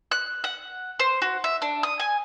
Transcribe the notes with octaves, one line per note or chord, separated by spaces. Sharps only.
F#6
F#5
C5
F#4
E5
D4
D#6
G#5